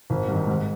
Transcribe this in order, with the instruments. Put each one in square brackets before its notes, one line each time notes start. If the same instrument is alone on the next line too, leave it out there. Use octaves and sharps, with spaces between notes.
[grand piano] G#1
G2 D#3
G#2